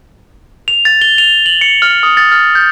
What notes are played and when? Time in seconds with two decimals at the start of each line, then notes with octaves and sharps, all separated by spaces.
0.68 F7
0.85 A6
1.02 G7
1.18 F7
1.46 F#7
1.61 C#7
1.82 F6
2.03 D#6
2.17 A6
2.32 F6
2.55 G6